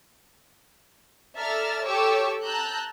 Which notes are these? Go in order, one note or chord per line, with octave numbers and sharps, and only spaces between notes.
A4 D5 E5 A#5 F6 A6
G4 A4 C#5 C#6 D6 E6
A5 A#5 E6 F#6 G6